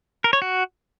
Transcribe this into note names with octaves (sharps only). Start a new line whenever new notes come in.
A#4
C#5
F#4